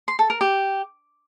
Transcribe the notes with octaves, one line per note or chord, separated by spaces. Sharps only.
C6
A4
A#4
G4